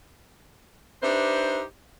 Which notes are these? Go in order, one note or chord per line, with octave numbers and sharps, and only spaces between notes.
D4 D#4 G4 B4 C5 E5